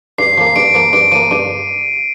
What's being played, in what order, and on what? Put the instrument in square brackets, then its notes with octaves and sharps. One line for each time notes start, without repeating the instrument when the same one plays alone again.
[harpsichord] G2 [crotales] C7
[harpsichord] F3 A#3
[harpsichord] G2 [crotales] D7
[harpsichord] F3 A#3
[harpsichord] G2 [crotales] D7
[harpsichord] F3 A#3 [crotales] D#7
[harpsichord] G2 [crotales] D#7